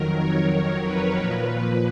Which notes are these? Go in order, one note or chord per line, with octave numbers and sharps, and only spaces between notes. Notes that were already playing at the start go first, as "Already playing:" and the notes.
Already playing: F2 D#3 F#3 A#4
C#5
B4
A#2 F3